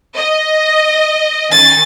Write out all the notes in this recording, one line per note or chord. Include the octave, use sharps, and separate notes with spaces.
D#5
D#3 C#4 G#5 A6